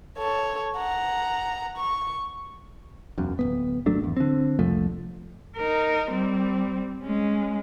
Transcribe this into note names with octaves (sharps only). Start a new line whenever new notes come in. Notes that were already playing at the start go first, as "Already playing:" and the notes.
A4 C#5
F#5 A#5
C#6
E1 B1 F#2
D1 G#1 B3
G#1 F#3 A3 D4
G#1 E2
D3 C4
C2 F2 F3 A3
D#4 A#4
G3 C4
G#3 C#4